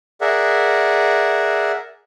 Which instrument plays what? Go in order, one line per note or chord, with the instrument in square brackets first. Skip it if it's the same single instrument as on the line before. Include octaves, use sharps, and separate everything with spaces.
[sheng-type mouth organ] G#4 A#4 D5 E5 F#5